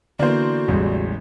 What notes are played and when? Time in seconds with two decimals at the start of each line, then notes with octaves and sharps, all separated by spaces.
0.19 D3 E3 A#3 B3 D4 F#4 C5
0.68 A1 E2 G3 G#3